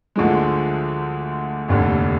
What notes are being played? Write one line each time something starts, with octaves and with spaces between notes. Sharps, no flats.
D2 D3 F3 G#3
F1 D#2 D3